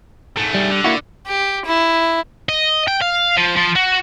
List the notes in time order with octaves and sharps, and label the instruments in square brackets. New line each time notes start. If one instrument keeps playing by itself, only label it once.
[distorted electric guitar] G#2 A3
[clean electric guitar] G3
[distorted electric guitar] D3
[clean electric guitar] A#3 E4 F#4
[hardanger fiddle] G4
E4
[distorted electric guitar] D#5
G5
F5
F3
F3
F#4